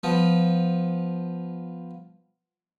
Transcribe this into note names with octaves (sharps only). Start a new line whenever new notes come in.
F3 B3